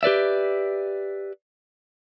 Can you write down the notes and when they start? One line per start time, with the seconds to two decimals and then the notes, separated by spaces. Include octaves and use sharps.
0.03 G4 B4 D5 E5